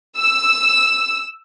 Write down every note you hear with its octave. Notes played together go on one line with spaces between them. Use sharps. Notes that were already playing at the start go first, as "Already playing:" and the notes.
E6